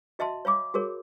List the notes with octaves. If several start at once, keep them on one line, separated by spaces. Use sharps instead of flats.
F#4 D#5 E5 A5 C6
C#5 F5 B5 D6
F#4 G#4 A#4 C#5